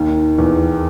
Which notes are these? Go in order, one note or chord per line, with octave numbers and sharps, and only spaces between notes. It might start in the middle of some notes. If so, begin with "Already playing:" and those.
Already playing: D#2 D#3
E2 E3